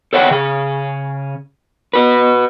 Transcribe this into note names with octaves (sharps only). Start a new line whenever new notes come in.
A4 C#5 E5 F#5 G5
C#3 G#4
F#4 B4